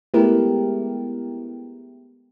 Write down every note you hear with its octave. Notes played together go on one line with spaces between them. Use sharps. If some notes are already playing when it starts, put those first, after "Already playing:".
G#3 A3 B3 E4 G4 A#4